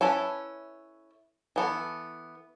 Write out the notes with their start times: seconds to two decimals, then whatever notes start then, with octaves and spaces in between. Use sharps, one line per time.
0.01 C#4 E4 A4 B4 G#5
1.56 E3 B3 A4